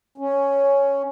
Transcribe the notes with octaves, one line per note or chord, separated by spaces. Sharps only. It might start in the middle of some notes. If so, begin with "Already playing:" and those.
C#4